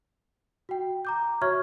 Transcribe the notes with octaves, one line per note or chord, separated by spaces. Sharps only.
F#4 G5
A#5 D6 G6
F#4 C#5 E5 C#6 F6 G#6